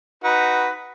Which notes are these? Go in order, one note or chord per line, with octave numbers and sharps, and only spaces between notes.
D#4 F#4 B4